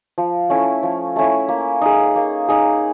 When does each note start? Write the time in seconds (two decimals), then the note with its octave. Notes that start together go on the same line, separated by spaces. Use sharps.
0.18 F3
0.49 A3 C#4 E4
0.83 F3
1.16 A3 C#4 E4
1.48 A#3
1.81 D#4 G#4
2.16 A#3
2.48 D#4 G#4